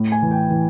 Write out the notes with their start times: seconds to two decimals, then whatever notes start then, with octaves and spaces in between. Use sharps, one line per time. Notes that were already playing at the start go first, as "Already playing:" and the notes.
Already playing: A2
0.12 G#5
0.22 E3
0.31 G5
0.50 E3